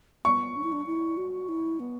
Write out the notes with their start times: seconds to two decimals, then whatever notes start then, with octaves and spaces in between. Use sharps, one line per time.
0.25 B3 C#6
0.56 D4
0.64 E4
0.72 D4
0.87 E4
1.17 F#4
1.49 E4
1.80 B3